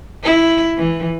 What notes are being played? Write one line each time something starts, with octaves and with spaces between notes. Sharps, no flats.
E4
E3